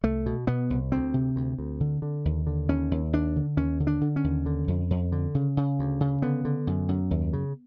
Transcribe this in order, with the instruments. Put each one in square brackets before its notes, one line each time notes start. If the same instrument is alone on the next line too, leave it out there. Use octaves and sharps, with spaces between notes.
[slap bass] C2 A3
B2
B2 B3
C2
D2 C4
C3
D2
D2
D3
D3
D#2
D3
D#2 C#4
D#2
D#2 D4
D3
D#2 C#4
D3
D4
D3
C#4
D#2
D3
F2
F2
D3
C#3
C#3
D2
C#3
D3 B3
D3
F#2
F#2
D#2
C#3